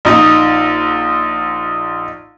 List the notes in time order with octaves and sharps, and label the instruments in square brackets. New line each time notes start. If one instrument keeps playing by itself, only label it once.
[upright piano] A#1 D#4